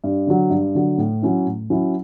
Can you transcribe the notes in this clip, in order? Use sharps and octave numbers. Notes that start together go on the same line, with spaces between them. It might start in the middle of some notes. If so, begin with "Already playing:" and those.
G2
D3 F#3
G2
D3 F#3
A2
F#3 C#4 E4
A2
F#3 C#4 E4